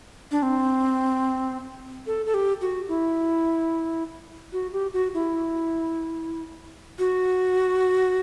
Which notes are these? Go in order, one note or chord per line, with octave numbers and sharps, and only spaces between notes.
D4
C4
A4
A4
G4
F#4
E4
F#4
G4
F#4
E4
F#4